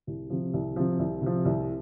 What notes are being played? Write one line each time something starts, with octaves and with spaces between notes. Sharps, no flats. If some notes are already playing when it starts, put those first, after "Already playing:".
C2
C3 F3
C2
C3 F3
C2
C3 F3
C2